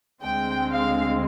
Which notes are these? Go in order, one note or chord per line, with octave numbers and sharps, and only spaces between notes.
D2 D3 G#3 C4 G5
F5